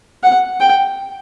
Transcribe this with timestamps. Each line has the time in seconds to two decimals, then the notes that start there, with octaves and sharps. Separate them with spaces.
0.23 F#5
0.60 G5